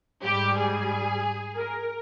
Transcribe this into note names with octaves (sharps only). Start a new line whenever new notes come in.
G#2 G3 G4
G#4
A#4